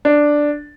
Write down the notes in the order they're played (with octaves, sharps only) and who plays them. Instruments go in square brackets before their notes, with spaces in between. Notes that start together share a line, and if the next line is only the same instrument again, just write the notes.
[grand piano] D4